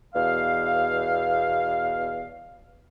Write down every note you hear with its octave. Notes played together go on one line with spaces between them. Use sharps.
E2 B2 F5